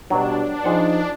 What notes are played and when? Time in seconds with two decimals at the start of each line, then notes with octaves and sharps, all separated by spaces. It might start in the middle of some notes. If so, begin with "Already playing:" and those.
0.10 B2 F#3 G3 D4
0.64 F3 D#4 G#4 C5 F#5